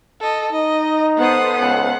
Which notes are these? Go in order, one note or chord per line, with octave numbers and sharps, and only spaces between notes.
A4 D#5
D#4 D#5
B3 A4 C5 F#5 D#6
C#2 F#5